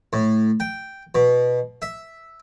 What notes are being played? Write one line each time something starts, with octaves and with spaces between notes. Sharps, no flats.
A2
G5
B2
E5